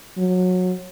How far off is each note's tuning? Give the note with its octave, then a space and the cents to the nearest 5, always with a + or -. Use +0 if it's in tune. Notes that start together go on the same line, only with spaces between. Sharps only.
F#3 -20